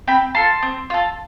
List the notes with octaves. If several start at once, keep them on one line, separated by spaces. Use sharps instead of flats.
C4 G5 B5
F4 A4 A5 C6
C4
F4 A4